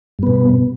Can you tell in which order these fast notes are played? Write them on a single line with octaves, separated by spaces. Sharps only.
G2 B3 B2